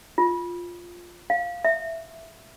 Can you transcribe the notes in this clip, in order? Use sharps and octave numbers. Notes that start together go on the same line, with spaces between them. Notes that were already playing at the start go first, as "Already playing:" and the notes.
F4
F5
E5